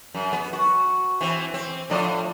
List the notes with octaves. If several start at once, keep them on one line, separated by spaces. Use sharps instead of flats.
F#2
B3
F#4
E3 C4
C4
A2 F3 D5